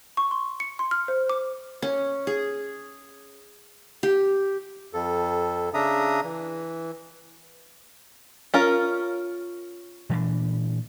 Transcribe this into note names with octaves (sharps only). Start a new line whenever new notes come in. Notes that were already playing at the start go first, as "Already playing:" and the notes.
C#6
C6
C#7
C6
F6
C5
D6
C#4
G#4
G4
F2 A4
C#3 D4 E5 A#5 D#6
E3
C#4 F4 A#4
A#2 E3 D4